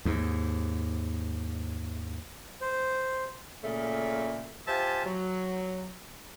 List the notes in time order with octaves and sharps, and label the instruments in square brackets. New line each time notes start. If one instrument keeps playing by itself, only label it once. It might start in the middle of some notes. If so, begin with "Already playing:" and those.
[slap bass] D#2 G#2
[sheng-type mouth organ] C5
[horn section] A#2 C#3 A3
F4 G4 C5 E5 G#5 A5
F#3